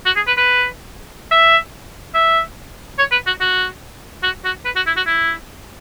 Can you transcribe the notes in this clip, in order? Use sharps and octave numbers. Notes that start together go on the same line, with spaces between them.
F#4
G#4
B4
B4
E5
E5
C#5
B4
F#4
F#4
F#4
F#4
B4
F#4
E4
F#4
E4